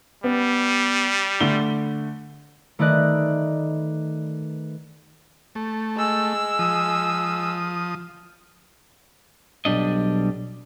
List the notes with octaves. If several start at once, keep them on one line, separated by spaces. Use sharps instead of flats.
G3 B3
D3 A3 G7
D#3 A3 B4 D5 D#5 F#6
A3
G#3 E6
F3 D#6
B1 G3 D4 D#5